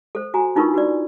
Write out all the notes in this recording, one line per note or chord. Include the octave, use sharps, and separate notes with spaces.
A4 C5
F#4 G#5 A#5
D4 D#4 F4 A#4 B4 C#6
F#4 B4 D5